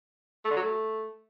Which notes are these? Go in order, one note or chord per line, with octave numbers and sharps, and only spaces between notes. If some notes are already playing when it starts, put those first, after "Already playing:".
A3
D3
F#3
A3